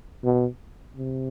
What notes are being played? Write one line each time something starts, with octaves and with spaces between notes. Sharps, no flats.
B2
C3